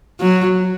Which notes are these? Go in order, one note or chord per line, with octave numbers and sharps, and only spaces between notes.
F#3